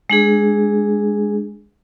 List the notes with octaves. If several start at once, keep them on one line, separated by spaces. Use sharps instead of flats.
G#3 D4 G#4